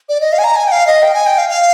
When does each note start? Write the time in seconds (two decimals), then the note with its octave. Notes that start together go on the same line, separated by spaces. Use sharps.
0.09 D5
0.21 D#5
0.32 F5
0.38 G#5
0.44 A#5
0.56 G#5
0.67 G5
0.72 F5
0.87 D#5
1.02 G5
1.14 G#5
1.26 G5
1.38 F5
1.49 F5